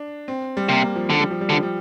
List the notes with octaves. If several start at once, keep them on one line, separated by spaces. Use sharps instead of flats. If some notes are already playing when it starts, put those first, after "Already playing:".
Already playing: D4
C4
G3
C3 A#3
F3
D3 F3
G3
F3
G3
D3
F3
G3